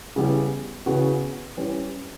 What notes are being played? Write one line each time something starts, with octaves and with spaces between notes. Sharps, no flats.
C#3 E3 G3 B3
C#3 E3 B3 F#4
E3 G3 C#4